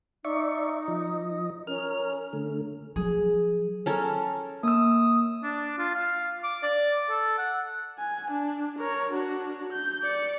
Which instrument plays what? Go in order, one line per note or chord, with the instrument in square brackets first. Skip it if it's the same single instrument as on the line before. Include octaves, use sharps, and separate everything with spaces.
[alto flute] D#4 [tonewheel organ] D5 E5 C#6
[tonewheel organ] F3 D#5
[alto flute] C#4 [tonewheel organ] A#4 F6
[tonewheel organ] D3 A3
[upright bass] F3 F#3 [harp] G#4
[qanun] C#4 A4 A#4
[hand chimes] A#3 E6 [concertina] D#6
[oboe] D4
F4
F5
D6
D5
A4
F#5
[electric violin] G#5
D4
A#4 C#5
D4 F#4
G6
D5 C#7